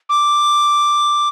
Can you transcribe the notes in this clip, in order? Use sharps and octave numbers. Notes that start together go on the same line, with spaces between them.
D6